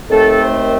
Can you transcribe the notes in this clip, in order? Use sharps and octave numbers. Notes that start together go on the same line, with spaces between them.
D#2 D#3 A3 C4 A4
C5